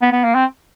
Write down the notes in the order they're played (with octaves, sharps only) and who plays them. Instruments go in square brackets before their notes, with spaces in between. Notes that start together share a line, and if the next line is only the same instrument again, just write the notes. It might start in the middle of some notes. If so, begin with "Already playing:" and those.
[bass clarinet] B3
B3
A#3
C4